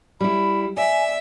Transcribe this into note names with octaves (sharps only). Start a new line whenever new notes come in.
G3 E4 B5
D5 E5 G#5